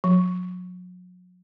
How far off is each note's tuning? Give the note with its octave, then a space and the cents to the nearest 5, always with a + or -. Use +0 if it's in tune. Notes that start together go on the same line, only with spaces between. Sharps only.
F#3 -40